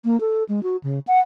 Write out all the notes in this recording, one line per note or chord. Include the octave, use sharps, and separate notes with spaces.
A#3
A4
G#3
F#4
C#3
F#5